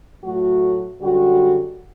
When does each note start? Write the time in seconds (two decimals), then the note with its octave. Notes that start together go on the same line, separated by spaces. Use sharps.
0.23 A2 F#3 A3 F#4
1.01 F#2 D3 G3 F#4